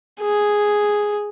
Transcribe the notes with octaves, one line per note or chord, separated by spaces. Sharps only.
G#4